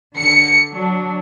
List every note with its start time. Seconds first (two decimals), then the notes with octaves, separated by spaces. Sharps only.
0.17 D3 C#7
0.71 F#3 D4